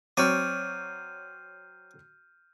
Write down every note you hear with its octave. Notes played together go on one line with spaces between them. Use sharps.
F#3 C4 C#5 D5 F6 G6 D#7